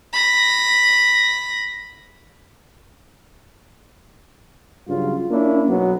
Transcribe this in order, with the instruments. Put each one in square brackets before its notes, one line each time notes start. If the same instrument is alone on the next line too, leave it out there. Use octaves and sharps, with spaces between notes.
[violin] B5 A#6
[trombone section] G2 C#3 F#3 F4
A#3 C#4 D4 E4
B1 F#3 B3